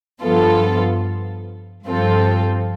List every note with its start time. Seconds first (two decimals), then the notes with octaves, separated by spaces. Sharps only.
0.22 G2 F3 B3 F4 A4
1.86 G2 F3 C4 F4 A4